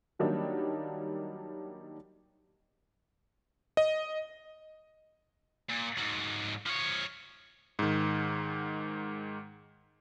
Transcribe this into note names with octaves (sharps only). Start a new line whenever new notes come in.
D#3 F#3 G3 A#3 D4 D#4
D#5
A#2
G#2 F#3
F3 C#5
G#2 D#3